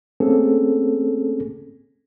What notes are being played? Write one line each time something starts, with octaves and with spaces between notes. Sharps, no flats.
A3 A#3 C4 C#4 G#4 A4